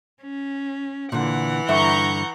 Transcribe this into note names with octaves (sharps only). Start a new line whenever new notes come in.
C#4
A#2 D3 E3 F#5
G2 D3 E5 A#5 C#6 G6